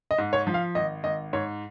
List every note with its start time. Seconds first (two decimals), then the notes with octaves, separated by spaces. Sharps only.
0.11 D#5
0.18 G#2
0.33 C#5
0.47 F3
0.54 F5
0.75 G#1 D#5
1.04 G#1 D#5
1.33 G#2 C#5